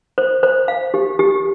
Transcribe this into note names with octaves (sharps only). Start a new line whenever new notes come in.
C5
C5
F5
G4
G4